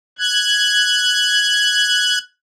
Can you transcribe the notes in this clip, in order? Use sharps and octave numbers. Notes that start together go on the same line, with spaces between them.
F#6 G#6